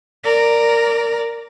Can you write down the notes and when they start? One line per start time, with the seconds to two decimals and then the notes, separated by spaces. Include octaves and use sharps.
0.24 A#4 D5